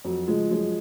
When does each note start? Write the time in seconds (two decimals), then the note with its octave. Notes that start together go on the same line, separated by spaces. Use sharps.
0.04 F2 F#3
0.28 C#3 F3 G#3
0.51 F#2 F3 G#3